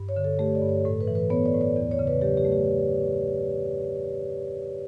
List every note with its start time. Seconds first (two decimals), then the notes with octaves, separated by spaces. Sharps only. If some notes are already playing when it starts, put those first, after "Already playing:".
Already playing: G2
0.09 C#5
0.16 D3
0.24 A4
0.39 A3 G4
0.55 D5
0.62 G2
0.69 C#5
0.85 A2 A4
1.01 B4
1.07 E3
1.15 B4
1.30 B3 C#5
1.46 D5
1.54 A2
1.61 D5
1.76 E2 D5
1.91 C#5
1.99 C#3
2.07 B4
2.21 F#3 G4
2.37 G4
2.45 A3
2.52 G4